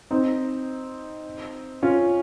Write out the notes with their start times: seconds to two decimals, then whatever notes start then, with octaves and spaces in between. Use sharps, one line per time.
0.11 C4 D#4
1.83 C#4 F4